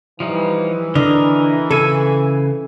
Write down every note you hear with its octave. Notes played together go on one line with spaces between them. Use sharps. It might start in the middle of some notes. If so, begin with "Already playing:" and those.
E3 F3 G3 D#4
D3 A#4 D#5
C#3 A4 G#5 E6